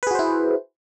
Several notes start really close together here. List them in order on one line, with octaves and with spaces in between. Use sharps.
B4 G#4 F#4 C5 E4